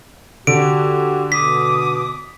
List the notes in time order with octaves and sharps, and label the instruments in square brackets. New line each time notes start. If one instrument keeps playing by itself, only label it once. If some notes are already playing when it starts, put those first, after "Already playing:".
[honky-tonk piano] D3 [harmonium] F#4 G4 [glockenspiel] D7
[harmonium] B2 [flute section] D6 D#6 [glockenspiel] B6